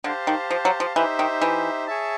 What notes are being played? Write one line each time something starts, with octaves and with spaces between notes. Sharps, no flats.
D3 G4 C5 F5 A5
D#3
F3
F#3
F3
E3 D#4 G4 C5 E5
D#3
E3
G#4 C#5 E5 A5